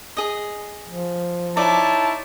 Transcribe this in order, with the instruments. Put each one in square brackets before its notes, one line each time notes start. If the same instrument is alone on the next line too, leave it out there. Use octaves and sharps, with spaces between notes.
[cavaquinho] G#4 D#5
[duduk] F3
[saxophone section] D#4 E4 C#5 [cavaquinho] D5 [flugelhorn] A5